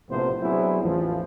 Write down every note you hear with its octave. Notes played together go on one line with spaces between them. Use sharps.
A#1 A2 C3 F3 B3 C5
F#3 B3 C4 D4 E4 G#4
A1 E2 F3